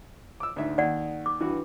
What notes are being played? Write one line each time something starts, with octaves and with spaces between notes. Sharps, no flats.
D6 E6
D2 G#2 E5
D#2 D5 F#5
D6
G2 E3 F#4